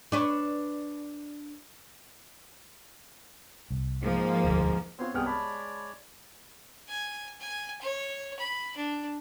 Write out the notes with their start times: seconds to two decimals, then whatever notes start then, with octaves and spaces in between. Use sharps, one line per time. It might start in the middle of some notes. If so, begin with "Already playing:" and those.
0.12 D4 B4 C#5
3.71 C2
4.03 G#2 F3 A#3
4.44 E1 D2
4.99 B3 C4 F4 C#5 C6
5.14 C2 B3 G#4 G5 F6
5.26 G#3 C#5 D5 A5 B5
6.89 G#5
7.40 G#5
7.81 C#5
8.39 B5
8.76 D4